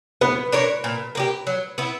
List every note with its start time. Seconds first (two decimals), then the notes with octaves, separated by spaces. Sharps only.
0.21 B3 B4
0.52 D4 A#4 C#5
0.84 A#2
1.15 A#3 D4 G4
1.47 F#3
1.78 B3 E4